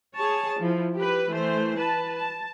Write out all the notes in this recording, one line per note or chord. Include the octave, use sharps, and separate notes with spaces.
G#4 C#5 A5
F3 E4
G4 B4
E3 A3 C5
B4 A5
A5